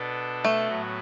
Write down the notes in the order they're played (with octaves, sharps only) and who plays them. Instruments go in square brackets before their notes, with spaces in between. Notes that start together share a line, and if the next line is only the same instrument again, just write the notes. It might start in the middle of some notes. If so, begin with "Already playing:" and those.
Already playing: [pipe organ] B2 B3 D4 A4
[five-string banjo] A3
[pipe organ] A2 F#3 B3 F#4